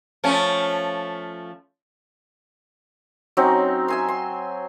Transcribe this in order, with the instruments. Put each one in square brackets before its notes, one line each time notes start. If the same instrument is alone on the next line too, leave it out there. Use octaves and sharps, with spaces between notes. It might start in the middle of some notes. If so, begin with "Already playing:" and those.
[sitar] F3 A3 C#4
[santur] F#3 C4 C#4 D#4
E5 G#5 C6
C6